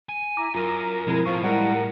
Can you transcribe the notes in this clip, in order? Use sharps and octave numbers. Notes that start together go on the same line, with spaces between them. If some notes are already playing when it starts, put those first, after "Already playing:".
G#5
E4 A#5 D6
F#2 F4 A#4 A#5
B2 F3 G#3 C4 E4
A2 F3 F4 C#6
G3 G#3 E4 A#4 F#5